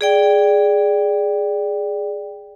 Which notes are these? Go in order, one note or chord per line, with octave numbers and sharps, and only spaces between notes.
G#4 D5 G5